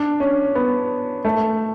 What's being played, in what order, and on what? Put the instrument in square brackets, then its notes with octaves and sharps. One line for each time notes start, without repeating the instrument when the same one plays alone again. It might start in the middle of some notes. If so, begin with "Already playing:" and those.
Already playing: [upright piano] D4
C#4
B3
A3